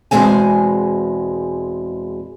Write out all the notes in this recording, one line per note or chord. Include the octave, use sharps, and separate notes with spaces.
E2 G#2 B2 G#3 C4 G#5